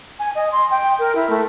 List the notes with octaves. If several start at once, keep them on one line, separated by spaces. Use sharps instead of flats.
G#5
D#5
C6
G5
A#4
E4
A3